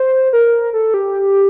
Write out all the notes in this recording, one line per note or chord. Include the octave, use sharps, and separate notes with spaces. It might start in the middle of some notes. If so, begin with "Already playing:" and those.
Already playing: C5
A#4
A4
G4